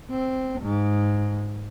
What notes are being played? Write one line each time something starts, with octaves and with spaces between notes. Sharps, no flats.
C4
G#2